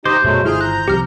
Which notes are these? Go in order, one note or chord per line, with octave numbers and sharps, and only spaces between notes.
D#4 G4 C5 D#5 D6
F#2 B2 F#3 G#3 A3 B3
G1 D#3 E4 F4 G#4 F6 G6
A#5 F#6 G6
C2 F2 G4 F6